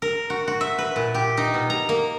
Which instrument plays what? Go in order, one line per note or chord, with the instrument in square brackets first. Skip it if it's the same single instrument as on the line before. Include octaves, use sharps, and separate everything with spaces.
[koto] A#4
F#4
F#4
E5
B4
A#2
G4
D#4
B2
A#5
A#3